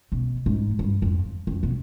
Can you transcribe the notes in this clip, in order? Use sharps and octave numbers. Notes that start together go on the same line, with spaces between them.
B2
G#2
G2
F2
F2
B2